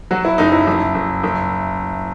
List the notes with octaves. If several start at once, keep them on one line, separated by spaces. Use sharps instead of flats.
F#3 F#4
E4
F#1 D#4
E4
F#1
F#1
F#1